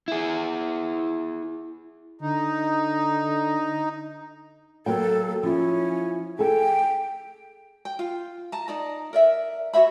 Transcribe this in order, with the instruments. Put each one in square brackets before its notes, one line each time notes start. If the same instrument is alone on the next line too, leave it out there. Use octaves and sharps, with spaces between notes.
[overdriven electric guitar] E4 G#4
[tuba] D3 [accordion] D#4
[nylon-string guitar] F#3 A#3 G5 [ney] A4
[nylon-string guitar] F3 E4 [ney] C#4
[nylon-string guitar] G#4 A4 [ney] G5
[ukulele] G5
F4
A5 A#5
D#4 D5 A#5
A#4 D5 E5
F#4 C#5 E5 B5